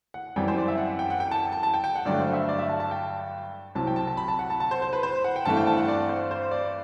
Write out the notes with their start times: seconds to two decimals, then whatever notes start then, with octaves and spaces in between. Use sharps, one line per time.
0.14 F#5
0.36 F#2 E3 G3 C4 G5
0.48 C5
0.58 D5
0.68 E5
0.78 F#5
0.99 G5
1.10 F#5
1.20 G5
1.31 A5
1.52 A5
1.63 A5
1.74 G5
1.84 G5
1.96 F#5
2.05 G2 D3 F#3 A3 D5
2.20 C5
2.33 E5
2.49 D5
2.59 E5
2.69 A5
2.80 A5
2.91 G5
3.75 C2 C3 F#3 C4 A5
3.87 G5
3.96 A5
4.07 A5
4.17 B5
4.28 A5
4.39 F#5
4.50 A5
4.60 A5
4.71 C5
4.82 C5
4.93 B4
5.03 C5
5.24 F#5
5.36 G5
5.45 G2 E3 A3 C4 A5
5.57 G5
5.67 A5
5.77 F#5
5.88 D5
6.09 C5
6.31 C5
6.51 D5